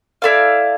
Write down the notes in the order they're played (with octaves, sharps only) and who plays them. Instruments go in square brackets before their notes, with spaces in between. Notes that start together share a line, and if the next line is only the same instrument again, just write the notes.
[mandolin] E4 A4 D5 F5